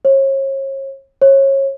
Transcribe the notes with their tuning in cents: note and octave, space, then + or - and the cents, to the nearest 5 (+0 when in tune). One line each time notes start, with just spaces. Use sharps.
C#5 -40
C#5 -30